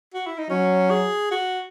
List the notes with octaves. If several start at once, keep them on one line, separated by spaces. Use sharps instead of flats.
F#4
E4
D#4
F#3 C#4
G#4
F#4